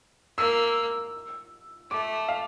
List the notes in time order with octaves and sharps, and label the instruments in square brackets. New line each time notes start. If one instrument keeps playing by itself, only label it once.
[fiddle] A#3 [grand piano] E6
[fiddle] A3 [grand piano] D6
[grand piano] F5